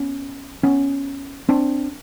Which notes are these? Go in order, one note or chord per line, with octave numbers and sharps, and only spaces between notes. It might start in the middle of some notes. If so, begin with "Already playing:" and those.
Already playing: B3 C#4
B3 C#4
C4 D4